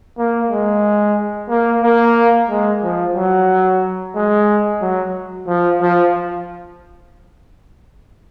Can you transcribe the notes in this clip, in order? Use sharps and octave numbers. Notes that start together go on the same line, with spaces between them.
A#3
G#3
A#3
A#3
G#3
F3
F#3
G#3
F#3
F3
F3